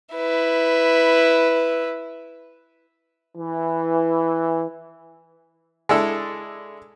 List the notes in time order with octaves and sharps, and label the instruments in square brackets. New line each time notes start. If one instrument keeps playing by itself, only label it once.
[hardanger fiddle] E4 B4
[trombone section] E3
[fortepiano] G#3 D4 E4 A4